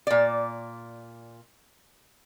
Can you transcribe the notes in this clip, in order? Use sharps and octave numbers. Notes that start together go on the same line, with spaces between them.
A#2 D5